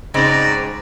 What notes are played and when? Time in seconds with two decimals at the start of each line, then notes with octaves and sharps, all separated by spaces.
0.14 G#2 C#3 G#3 C4 F#4 D5 A#5